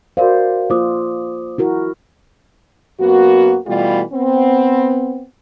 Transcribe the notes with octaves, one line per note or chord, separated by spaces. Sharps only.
F#4 A#4 C5 D5 F5
A#3 F4 C5 D6 D#6
E4 F#4 A#4
F#2 A#3 B3 F#4
B2 E3 G3 A3 F4 G4
B3 C4